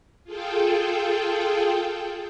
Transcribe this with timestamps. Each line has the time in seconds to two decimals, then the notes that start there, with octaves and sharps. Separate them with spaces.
0.24 F4 G#4 A4 G5